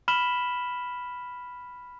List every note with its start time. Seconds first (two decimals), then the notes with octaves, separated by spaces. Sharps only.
0.08 B5 F6 B6 E7 F#7 G7